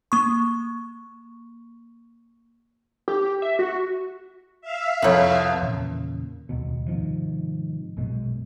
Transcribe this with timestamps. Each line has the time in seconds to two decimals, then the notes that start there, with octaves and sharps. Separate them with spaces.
0.12 A#3 C#6
3.08 G4
3.42 E5
3.59 F#4
4.61 E5 F5
5.02 C2 F2 B4 C#5
5.62 E2 A#2 C#3
6.49 D#1 C#2 B2
6.88 G#2 C3 D#3 F3
7.97 A#1 F#2 B2 G#3